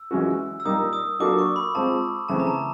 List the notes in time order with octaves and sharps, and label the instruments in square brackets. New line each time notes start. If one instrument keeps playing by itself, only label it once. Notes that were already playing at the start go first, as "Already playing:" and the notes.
Already playing: [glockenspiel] E6
[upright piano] E3 G#3 C#4 F#4
[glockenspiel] E6
[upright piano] A#2 G3 A#3 D#4 [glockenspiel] D#6
[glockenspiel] D#6
[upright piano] F#3 A#3 D4 F#4 A4 [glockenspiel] D6
[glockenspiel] C#6
B5
[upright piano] G#3 C4 F4 [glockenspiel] A5
[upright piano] C#3 E3 A3 C4 [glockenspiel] A5
[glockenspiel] A#5
A5